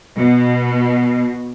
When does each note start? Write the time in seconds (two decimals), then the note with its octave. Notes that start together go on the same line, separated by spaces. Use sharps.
0.16 B2